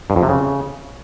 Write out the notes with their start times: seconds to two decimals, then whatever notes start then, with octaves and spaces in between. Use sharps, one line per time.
0.10 G2
0.16 F2
0.23 C3
0.29 C#3